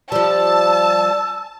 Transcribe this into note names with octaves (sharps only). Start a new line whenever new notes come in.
F3 G3 D5 A5 E6